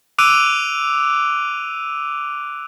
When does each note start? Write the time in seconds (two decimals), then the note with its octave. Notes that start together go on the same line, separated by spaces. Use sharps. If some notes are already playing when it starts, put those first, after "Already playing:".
0.18 D6 E6 F#6 D7 D#7 F7